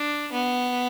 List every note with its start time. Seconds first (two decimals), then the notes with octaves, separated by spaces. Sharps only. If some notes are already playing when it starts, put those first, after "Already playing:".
Already playing: D4
0.33 B3